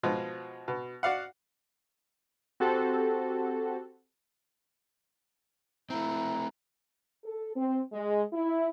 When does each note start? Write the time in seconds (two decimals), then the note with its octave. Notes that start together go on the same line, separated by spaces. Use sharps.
0.03 B2 F3 G#3
0.68 B2
1.03 F#4 D5 F5 F#5
2.60 C4 F#4 G4 A4
5.90 A3 C4 E4 A#5
7.24 A4
7.55 C4
7.92 G#3
8.33 E4